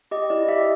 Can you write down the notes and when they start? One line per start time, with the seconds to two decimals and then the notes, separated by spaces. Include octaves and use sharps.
0.11 G4 D#5
0.30 E4 D5
0.48 G4 E5
0.58 D#5